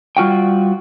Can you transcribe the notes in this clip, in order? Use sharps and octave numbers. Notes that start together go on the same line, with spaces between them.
G3 F4 F#4 G5